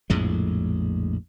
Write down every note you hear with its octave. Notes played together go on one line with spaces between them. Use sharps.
A#1 F2 A2 G#3